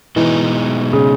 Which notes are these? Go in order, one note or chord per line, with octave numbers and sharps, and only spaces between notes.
B2 E3 G#3 D#4
C#3